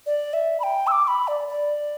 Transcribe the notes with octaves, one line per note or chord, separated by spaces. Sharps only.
D5
E5
B5
G5
E6
D6
B5
D5
D5